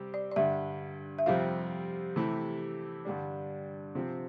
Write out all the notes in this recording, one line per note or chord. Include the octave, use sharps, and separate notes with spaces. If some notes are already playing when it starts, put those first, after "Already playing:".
Already playing: C3 G3 C4 G4
D5
D5
G2 D3 G3 E5
E5
F2 C3 G3 C4 F4 F5
C3 E3 A3 E4 G4
G2 D3 G3 D4
C3 F3 C4